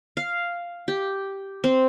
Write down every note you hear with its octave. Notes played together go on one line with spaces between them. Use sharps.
F5
G4
C4